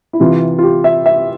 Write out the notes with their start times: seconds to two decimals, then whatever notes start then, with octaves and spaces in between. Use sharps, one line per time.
0.13 E4
0.20 C3 E3 F4
0.59 F4
0.63 G4
0.84 E5
1.06 E5